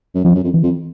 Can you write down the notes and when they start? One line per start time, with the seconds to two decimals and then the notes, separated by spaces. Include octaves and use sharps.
0.15 F#2
0.24 F2 F3
0.35 F#2
0.43 F2
0.54 E3
0.63 F2